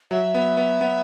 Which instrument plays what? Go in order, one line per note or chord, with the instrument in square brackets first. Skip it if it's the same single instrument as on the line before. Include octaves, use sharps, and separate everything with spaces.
[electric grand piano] F#3 [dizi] E5
[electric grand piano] B3
B3
B3